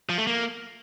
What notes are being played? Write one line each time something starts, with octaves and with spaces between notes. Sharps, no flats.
F3
A3
A#3